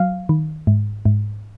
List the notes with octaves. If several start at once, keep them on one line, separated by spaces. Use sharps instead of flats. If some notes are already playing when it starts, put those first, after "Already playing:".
Already playing: F#3 F5
D#3
G#2
G#2